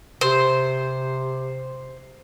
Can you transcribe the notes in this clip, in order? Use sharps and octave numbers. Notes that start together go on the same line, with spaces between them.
C3 C5